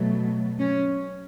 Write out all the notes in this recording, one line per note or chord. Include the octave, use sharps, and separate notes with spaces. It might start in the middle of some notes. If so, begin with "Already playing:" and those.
Already playing: B2 F#3 A3
C#4